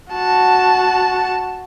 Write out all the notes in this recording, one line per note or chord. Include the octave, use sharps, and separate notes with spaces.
F#4 A5